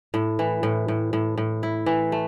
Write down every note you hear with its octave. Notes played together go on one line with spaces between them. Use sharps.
A2
E3
A2
A2
A2
A2
E4
E3
A3